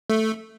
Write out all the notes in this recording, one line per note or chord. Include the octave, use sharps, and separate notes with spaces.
A3